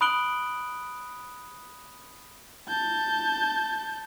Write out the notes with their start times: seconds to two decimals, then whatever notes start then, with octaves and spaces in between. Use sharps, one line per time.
0.01 B5 D#6 F#6 D7 F#7 G7
2.68 A5 G6